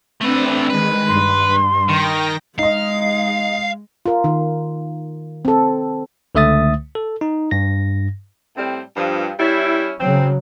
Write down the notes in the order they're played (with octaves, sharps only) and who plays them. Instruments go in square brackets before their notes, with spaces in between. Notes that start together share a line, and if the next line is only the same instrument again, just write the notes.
[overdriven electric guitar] A3 B4 [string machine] C4 D4
[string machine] D#3 G#3 [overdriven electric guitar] B4
[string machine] G2 [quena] C6
[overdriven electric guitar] D#3 [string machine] G5 A#6
[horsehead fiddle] G#3 [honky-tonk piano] D#4 D#5 [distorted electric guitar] F5
[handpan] F4 A#4
D#3
C4 A4
[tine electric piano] C#2 D3 A3 E5 D#6 A6
A4
D#4
G2 A#6
[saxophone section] A2 G3 C4
G2 F3
G3 C#4 E4
[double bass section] C#3 F#3 [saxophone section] C4